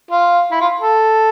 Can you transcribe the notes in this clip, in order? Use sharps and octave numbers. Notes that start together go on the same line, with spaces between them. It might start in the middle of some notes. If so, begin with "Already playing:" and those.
F4
E4
F4
A4